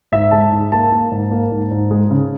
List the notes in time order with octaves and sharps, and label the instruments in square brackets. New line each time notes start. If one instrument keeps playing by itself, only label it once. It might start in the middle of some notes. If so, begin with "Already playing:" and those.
[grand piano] G#2 E5
G#3 A5
G#2
A#3 A5
A#3
G#2
A#3
G#2
G#2
G#3
C#3